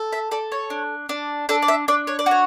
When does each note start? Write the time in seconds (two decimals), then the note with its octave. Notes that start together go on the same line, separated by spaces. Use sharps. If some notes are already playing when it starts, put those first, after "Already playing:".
Already playing: A4
0.13 E5
0.31 A4 D5
0.52 C#5
0.70 D4
1.09 D4
1.49 D4 A4
1.62 D5
1.68 E5
1.88 D4 D5
2.07 C#5
2.19 D5
2.26 F#4
2.31 C#5